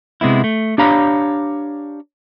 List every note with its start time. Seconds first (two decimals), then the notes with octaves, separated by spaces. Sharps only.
0.21 C3 G#3 B3 E4
0.44 A3
0.78 D4 G4 C#5 F5 A#5 B5